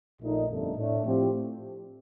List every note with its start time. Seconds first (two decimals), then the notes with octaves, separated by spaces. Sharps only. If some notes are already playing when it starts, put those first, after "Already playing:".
0.21 A#1 A#2 A3 D#4
0.49 G1 F2 D3 A3
0.77 A2 A3 D4
1.05 A2 F3 C4 G4